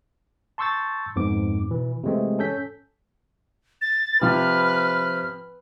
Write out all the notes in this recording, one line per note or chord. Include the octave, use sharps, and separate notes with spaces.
A5 C6 C#6 E6 G6 A6
F2 G#2 B3 D6
B2 E3
C3 E3 G#3 A3 C4
C#4 A4 G6 B6
A6
C3 F3 B4 F6